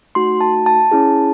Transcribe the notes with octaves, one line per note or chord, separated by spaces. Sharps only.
A3 D#4 F#4 C6
A5
A5
C#4 E4 G#4